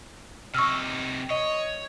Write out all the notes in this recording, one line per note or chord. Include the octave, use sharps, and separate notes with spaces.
C3 D#4 C#6 E6 F6
C#5 D#5